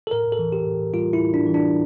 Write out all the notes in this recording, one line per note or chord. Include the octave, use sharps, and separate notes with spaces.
A4
A2 A#4
A4
E3
G4
A2
G3 F4
E4
A2
D4
E3
D4